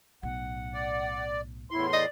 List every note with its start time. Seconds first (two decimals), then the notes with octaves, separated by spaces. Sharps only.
0.23 B1 A2 F#5
0.74 D5
1.71 E2 A2 E4 C6
1.93 D5 D#5